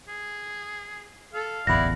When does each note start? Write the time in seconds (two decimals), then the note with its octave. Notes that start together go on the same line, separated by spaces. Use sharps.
0.08 G#4
1.34 A4 F5
1.67 D1 A1 E2 E4 D5 F#5 B5 A#6